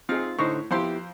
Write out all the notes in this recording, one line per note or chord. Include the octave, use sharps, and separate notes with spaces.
C4 D#4 F4 G#4 F6
A2 D3 D#4 C5 C#6
F2 B3 E4 G4 C5 C6